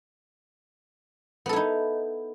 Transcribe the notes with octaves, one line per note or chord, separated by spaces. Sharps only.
B3 D#4 E4 A4